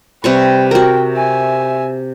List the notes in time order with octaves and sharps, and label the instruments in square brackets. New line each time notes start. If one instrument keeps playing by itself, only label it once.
[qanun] C3 G3 C#6 [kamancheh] B4 G5
[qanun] F#4 A#4 [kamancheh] G5
[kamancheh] E5 G#5